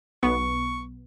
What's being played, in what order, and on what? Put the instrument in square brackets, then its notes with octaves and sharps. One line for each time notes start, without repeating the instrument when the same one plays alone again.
[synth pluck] B1 B3 [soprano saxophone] C#6